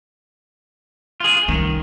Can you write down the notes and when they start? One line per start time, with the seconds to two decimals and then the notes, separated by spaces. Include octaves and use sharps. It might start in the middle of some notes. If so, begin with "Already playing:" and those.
1.20 F4 G#4
1.48 C2 D#3 C#4